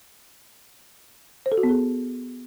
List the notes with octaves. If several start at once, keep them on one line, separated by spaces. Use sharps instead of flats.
C5
A4
F#4
B3
G#4